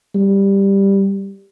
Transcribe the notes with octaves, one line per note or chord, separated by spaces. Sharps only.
G3